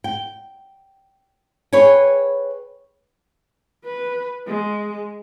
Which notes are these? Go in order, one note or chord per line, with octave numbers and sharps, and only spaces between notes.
G5
G#4 B4 C#5 G5 G#5
B4
G#3